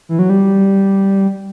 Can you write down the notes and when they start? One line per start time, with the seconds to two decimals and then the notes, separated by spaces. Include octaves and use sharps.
0.09 E3
0.19 F#3
0.30 G3